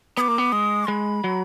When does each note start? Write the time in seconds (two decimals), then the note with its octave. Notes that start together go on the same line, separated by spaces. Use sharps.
0.17 B3 D6 D#6
0.28 A#3
0.38 B3
0.52 G#3 D#6
0.88 G#3 B5
1.24 F#3